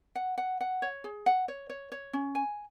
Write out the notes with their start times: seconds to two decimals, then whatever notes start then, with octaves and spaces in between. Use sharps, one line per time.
0.15 F#5
0.38 F#5
0.61 F#5
0.82 C#5
1.04 G#4
1.26 F#5
1.48 C#5
1.70 C#5
1.92 C#5
2.13 C#4
2.35 G#5